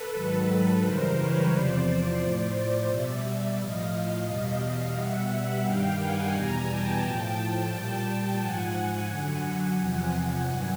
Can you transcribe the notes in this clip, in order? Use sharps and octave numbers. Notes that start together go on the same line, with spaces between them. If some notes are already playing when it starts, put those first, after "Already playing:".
Already playing: A4 B4
G#2 D#3 F#3
F#2 C#3 E3 G3 A#4 C5
B4 C#5
E2 C3 F3 C5 D5
A2 F3
B2 G3 D5 E5
A2 F3 D#5 F5
E2 B2 G3
B2 G3 E5 F#5
G2 D#3 G3 F5 G5
F#5 G#5
E2 B2 G3 G#5 A#5
G5 A5
A2 F3
A#2 G3
G#2 F3 F#5 G#5
F#2 D3 F#3
E2 C3 F3 F#5 G#5
G2 D#3 F#3